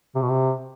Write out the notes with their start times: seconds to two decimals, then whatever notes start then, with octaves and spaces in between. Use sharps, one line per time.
0.15 C3
0.22 B2
0.30 C3